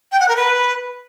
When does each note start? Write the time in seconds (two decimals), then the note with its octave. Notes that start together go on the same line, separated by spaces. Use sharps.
0.12 G5
0.20 F#5
0.28 A#4
0.37 B4